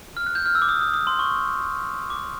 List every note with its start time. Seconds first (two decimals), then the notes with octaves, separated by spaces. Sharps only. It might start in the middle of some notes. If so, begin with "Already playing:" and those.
0.17 F6
0.26 F#6
0.35 G6
0.46 F6
0.55 E6
0.62 D6
0.69 D#6
0.81 D#6
0.94 D#6
1.07 C6
1.19 C#6
2.10 D6